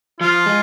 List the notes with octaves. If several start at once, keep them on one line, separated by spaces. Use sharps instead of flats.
F3 F4
G#3